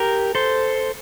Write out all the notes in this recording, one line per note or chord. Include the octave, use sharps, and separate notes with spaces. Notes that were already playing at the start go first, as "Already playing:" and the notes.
Already playing: G4 A#4
A4 C5